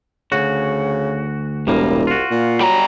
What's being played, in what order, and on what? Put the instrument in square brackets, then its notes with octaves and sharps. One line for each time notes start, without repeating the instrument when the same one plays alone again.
[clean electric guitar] D2 F#4 [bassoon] C#3
[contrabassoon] E1 [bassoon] C2 [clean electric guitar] A2 G3 A#3
[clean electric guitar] F4 F#4
[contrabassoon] A#2
[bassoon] F#3 [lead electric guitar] G3 A#5